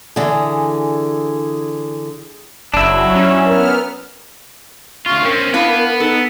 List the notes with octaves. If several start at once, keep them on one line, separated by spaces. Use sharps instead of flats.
D3 E3 G#4
F#1 F#3 D4 E4
C#4
B3 A#4 F6
D2 F4 C#6
C4 C#4 A#4
B3 D4 E4 B4 F5
D#4 A4